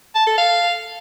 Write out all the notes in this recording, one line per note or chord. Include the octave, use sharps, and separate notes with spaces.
A5
A4
F5